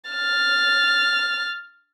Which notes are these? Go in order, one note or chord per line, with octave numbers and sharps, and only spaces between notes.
F6 A6